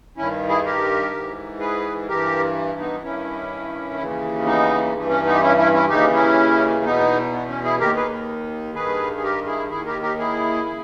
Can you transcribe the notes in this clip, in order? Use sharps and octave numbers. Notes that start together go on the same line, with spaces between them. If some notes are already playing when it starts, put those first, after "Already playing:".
G2 D#3 C#4 E4
E4 G#4
G4 A#4
G#2 E3
G#4 B4
G2 E3 G4 A#4
B3 D#4
G2 D#3 C#4 E4
D#2 C#3 E3
B3 D#4
G2 E3
C#4
B3 D#4
G4
C#4 E4
C#4 E4
C#4 E4
D#2 C#3 E3 D#4 G4
C#4 E4
E2 B2 B3 D#4
B3
C#4
E4 G#4
D#2 D#3 G4 A#4
G#4 B4
G2 D#3 G#4 B4
G#4
G4 A#4
E4 G#4
D#2 D#3 E4 G#4
G4 A#4
G4 A#4
E4 G#4
C#3